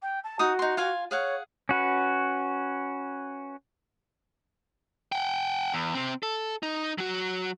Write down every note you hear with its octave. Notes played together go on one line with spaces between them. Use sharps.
G5
A5
D#4 F#4 D#6
D#4 C6
F4 F5 G#5
G#4 C#5 F5 F#5
C#4 F#4 B4
F#5 G5
E2
C3 C4
A4
D#4
F#3 F#4